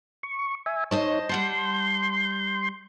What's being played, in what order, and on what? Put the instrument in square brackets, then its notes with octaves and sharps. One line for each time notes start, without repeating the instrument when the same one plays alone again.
[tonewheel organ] C#6
E5 G#5
[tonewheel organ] D#4 C#5 [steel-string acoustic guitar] C5 D#5 A5
[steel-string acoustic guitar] G3 F#5 A5 [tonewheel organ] C6 G6